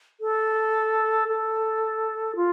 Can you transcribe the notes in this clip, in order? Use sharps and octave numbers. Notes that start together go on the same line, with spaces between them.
A4
A4
F4